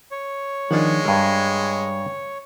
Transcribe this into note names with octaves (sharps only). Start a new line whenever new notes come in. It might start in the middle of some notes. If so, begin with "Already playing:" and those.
C#5
D#3 F3 G#3 D4 F4 F#5
G2 G3 G#4 A#4